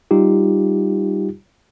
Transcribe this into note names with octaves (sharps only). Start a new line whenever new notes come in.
G3 D#4 F4 G4